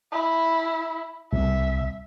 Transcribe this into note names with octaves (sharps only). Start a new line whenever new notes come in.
E4
C2 E5